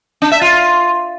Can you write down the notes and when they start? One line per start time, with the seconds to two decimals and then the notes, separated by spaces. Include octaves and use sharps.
0.22 D4
0.32 E5
0.41 F4